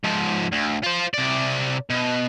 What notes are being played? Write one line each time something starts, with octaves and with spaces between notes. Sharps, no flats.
G#2 F3
D2
F4 C5
C3 D5
B2